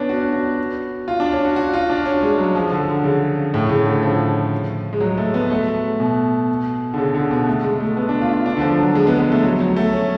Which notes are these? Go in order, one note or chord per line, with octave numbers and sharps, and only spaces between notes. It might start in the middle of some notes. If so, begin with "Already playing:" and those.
Already playing: B3 C#4 D4
F#4
F#4
F4
D4
C#4
F#4
F#4
F4
D4
C#4
G#3
F#3
F3
D3
D3
C#3
A2
C#3
D3
F3
G#3
F#3
A3
B3
A3
B2
D3
C#3
D3
B2
A3
G#3
A3
B3
D4
F4
F4
D4
D3
F3
F#3
G#3
B3
B3
A3
F#3
F#3
A3
C#4